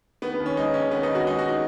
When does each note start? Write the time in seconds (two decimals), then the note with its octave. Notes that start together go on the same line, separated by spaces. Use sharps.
0.22 D#3 B3
0.34 B3
0.40 D#2
0.46 C#4
0.57 G#3 D#4
0.74 D#2 C#4
0.91 D#3 B3
1.03 D#4
1.09 D#2
1.15 F#4
1.26 G#3 D#4
1.39 F#4
1.49 D#4